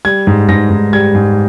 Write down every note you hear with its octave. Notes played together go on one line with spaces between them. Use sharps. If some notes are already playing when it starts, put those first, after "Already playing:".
G3 G#6
G#2
G#2 A#6
G#2
G3 G#6
G#2